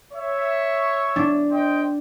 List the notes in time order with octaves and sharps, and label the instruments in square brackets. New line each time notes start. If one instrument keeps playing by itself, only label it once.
[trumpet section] C#5 E5
[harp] D4
[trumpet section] C5 D#5 G5